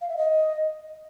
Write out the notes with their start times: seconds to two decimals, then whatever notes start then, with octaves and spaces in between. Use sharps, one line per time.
0.01 F5
0.09 E5
0.17 D#5